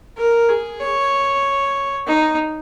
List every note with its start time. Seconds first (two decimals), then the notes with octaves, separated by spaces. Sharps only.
0.17 A#4
0.49 G#4
0.81 C#5
2.07 D#4